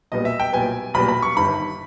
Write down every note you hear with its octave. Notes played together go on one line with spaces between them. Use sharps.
B1 A#2 G3 B3 D#5
E5
G5
B1 A#2 G3 B3 G#5
B1 A#2 G3 B3 B5
B5
C#6
G1 G2 D#3 B5